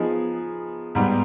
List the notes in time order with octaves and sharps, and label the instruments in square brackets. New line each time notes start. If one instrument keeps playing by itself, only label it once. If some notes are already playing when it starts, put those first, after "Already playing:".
Already playing: [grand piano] F3 B3 D#4 G#4
G#2 G3 B3